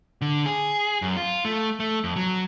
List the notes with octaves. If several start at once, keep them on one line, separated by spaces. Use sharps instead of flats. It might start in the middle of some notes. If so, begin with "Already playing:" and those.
D3
G#4
F#2
F4
A3
A3
F2
F#3